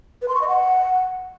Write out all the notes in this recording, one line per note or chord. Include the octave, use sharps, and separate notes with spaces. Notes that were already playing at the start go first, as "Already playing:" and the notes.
B4
C6
C#6
D#5
F#5